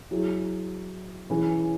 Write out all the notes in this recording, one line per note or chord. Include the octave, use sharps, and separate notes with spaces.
F#3 E4 G#4
E3 C#4 G#4